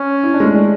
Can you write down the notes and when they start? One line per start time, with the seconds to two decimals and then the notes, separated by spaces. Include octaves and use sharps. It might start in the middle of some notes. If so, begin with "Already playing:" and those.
Already playing: C#4
0.23 E4
0.34 D4
0.40 G#3
0.45 A3
0.55 D4